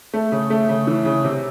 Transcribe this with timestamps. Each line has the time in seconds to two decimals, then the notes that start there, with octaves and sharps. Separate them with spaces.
0.14 A3
0.32 C#3
0.50 A3
0.69 C#3
0.87 E3
1.05 C#3
1.24 C3